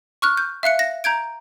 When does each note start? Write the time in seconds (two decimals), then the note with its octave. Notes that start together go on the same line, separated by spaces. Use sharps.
0.22 C#6 F6 F#6
0.37 G6
0.63 E5 F5 F#6 C#7
0.79 A#6
1.04 A#5 G6 G#6 D7